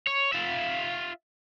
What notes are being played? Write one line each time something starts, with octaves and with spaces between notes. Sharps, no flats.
C#5
F4 E5